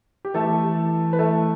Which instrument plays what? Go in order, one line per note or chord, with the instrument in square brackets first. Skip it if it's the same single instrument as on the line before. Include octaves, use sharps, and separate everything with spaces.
[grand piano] G4
[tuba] E3 [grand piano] A3 A4
[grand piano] B4
A3 A4